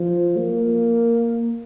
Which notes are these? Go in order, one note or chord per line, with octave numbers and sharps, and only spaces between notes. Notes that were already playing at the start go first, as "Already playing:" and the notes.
Already playing: F3
A#3